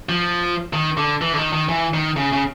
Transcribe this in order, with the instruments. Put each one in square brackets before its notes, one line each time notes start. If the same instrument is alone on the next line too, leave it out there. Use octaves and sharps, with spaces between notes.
[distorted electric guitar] F3
D#3
D3
E3
D3
D#3
D#3
E3
D#3
C#3
C#3